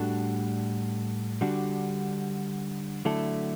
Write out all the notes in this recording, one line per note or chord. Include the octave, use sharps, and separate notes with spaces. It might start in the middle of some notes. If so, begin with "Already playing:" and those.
Already playing: A2 G3 D4 F#4 A4
D3 G3 D4 F#4
D3 F#3 A3 E4 A4